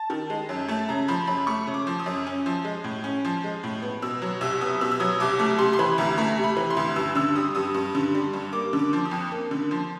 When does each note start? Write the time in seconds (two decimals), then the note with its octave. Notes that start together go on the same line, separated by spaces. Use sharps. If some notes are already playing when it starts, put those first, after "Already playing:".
Already playing: A5
0.10 D#3
0.30 G#3
0.49 F#2
0.69 A3 A5
0.89 C#3 A#5
1.08 F3 B5
1.27 F#2 B5
1.47 A3 C#6
1.67 C#3
1.74 D6
1.87 F3
2.00 D#6
2.06 F#2
2.27 C#4
2.46 F3
2.65 G#3
2.84 A2
3.04 C#4
3.25 F3
3.44 G#3
3.63 A2
3.82 B3
4.02 B2 E6
4.22 F#3
4.41 C2 E6
4.61 B3 D#6
4.81 B2 E6
4.92 E6
5.00 F#3 D#6
5.20 C2 D6
5.39 A3 D6
5.59 C3 C6
5.73 C6
5.79 E3 B5
5.98 D2 A#5
6.17 A3 A#5
6.38 C3
6.44 B5
6.57 E3
6.70 C6
6.77 D2
6.96 G2 E6
7.15 D3 E6
7.35 G3 D#6
7.55 G2 D#6
7.74 G2
7.95 D3
8.15 G3
8.33 G2
8.53 A#3 D6
8.73 D3
8.79 D6
8.93 F3
9.05 D#6
9.11 F2
9.32 A#3
9.51 D3
9.71 F3